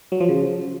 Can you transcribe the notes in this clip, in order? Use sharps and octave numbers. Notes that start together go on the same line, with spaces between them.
F#3
F3
C#3